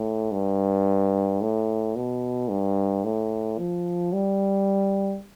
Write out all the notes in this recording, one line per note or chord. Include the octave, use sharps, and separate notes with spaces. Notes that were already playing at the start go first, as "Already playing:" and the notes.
Already playing: A2
G2
A2
B2
G2
A2
F3
G3